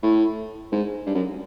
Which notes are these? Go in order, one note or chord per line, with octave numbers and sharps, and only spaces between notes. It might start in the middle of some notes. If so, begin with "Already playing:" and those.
A2
G#2
G2
F#2